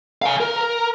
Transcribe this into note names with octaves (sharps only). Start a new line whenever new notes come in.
F5 G#5
A#4